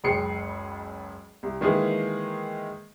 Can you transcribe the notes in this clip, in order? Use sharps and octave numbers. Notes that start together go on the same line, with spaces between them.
F#1 C#2 G#4 G5 C7 C#7
C2
D#3 E3 G#3 A#3 G#4